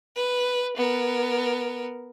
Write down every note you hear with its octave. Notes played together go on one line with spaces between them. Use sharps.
B4
B3 A#4